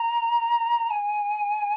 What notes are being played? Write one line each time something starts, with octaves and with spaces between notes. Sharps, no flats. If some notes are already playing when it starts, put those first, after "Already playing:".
Already playing: A#5
G#5